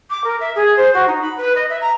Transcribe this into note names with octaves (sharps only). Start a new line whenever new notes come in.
D6
A#4
E5
G#4
C5
F#4
D#4
B5
B4
D#5
E5
A#5